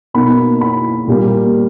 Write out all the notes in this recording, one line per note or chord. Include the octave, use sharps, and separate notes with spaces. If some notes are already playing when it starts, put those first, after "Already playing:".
B2 A#3 D#4 B5
B5
A#2 G3 A#3